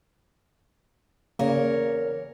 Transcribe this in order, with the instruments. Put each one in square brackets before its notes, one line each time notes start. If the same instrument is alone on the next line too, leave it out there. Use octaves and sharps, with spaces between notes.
[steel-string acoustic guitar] E2 A#4 C#5 [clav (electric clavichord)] C#3 A#3